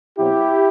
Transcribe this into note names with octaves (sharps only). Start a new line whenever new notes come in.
B2 F#3 C4 E4 G4